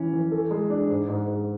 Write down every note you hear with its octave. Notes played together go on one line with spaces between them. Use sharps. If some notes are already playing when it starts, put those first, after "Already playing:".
Already playing: E3 C#4
E3
A4
G#3
D4
G#2
G#2
G#2